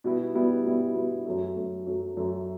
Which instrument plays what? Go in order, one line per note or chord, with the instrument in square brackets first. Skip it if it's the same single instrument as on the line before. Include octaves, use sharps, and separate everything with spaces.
[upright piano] B2 G3 B3 E4
B2 G3 B3 E4
B2 G3 B3 E4
B2 G3 B3 E4
F#2 F#3 A3
F#2 F#3 A3
F#2 F#3 A3
F#2 F#3 A3